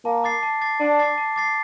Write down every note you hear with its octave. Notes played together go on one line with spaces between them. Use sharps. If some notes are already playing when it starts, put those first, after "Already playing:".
A#3 A5
D6 A6 C7
A5
D6 A6 C7
D4 A5
D6 A6 C7
A5
D6 A6 C7